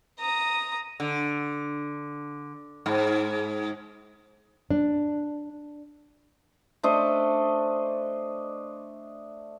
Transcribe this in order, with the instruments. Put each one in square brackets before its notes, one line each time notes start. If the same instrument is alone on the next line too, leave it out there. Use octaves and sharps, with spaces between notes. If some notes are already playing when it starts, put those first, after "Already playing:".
[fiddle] A#5 D#6
[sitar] D3
G#2
[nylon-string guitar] D4
[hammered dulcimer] A3 D4 C5 D#5